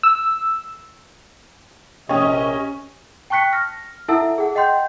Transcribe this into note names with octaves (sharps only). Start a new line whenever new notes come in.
E6
A#1 C3 C#4 C#5 D#5
G5 A5 C#6 F#6 B6 C#7
F6 A#6
E4 A4 E5 F#5 A5 E6
G#4 F#5
D#5 F#5 G5 C6 G6